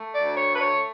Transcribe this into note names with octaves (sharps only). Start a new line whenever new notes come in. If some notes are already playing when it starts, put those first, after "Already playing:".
Already playing: A3
D5
D2
C#5
A3 B4
C#5